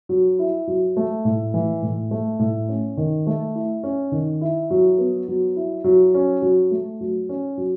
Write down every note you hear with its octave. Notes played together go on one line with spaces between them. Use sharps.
F#3
E4
F#3
A3
A2
E3
A2
A3
A2
C#4
D#3
A3
E4
C#4
D#3
E4
F#3
B3
F#3
E4
F#3
C#4
F#3
A3
F#3
C#4
F#3